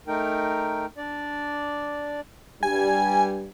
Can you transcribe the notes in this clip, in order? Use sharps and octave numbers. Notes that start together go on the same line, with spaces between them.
A3 D#4 A#4 G5
D4 D5
G2 G3 G#5